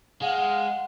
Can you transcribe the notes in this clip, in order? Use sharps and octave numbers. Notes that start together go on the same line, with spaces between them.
G#3 F5 F#5